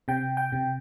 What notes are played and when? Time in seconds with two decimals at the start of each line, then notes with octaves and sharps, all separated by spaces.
0.08 C3 G5
0.37 G5
0.52 C3